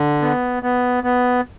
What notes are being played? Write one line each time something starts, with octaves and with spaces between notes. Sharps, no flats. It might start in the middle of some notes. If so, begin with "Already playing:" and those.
Already playing: D3
B3
B3
B3